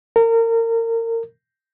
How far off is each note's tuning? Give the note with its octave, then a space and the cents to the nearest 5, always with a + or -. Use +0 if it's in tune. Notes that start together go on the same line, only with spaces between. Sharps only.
A#4 -30